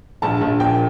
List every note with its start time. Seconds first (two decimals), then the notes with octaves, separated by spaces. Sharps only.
0.22 A#1 A5
0.41 A#1
0.60 A#2 G5